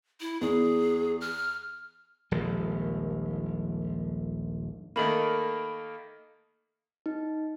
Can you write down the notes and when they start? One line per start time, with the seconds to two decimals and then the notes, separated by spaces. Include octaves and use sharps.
0.21 E4
0.41 E2 G#4
1.21 F6
2.31 D#1 A#1 F2 G#3
4.96 D#3 A3 A#3 B5 F#7
7.06 D#4